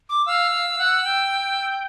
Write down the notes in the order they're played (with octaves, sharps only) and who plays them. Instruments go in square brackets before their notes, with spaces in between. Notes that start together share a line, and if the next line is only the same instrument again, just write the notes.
[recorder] D6
[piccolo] F5 [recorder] E6
[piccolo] F5
F5
F#5
G5